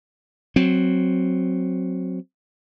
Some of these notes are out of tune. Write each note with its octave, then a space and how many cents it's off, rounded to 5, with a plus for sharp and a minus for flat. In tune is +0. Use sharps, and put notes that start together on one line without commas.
F#3 +0 C4 +0